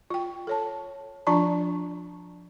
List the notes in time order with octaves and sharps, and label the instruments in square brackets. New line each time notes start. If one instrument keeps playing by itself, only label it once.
[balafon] F4 G5
A4 C#5 A5
F3 D4 F4 D5 A5 A#5